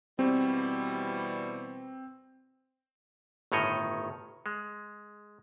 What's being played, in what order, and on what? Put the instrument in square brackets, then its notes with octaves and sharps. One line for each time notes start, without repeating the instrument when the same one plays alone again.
[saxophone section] B2 E3 G3 [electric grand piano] C4
[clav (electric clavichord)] G1 A2 D#3 C#5 D#5
G#3